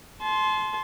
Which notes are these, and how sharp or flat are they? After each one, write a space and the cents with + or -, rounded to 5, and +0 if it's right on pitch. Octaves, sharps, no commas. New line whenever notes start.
A5 -35 C6 +0